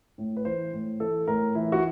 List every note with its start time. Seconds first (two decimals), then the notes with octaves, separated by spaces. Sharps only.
0.18 A2
0.37 B4
0.45 E3 C5
0.73 A2
1.00 E3 A4
1.27 A2 A#4
1.55 E3 E4
1.72 F#4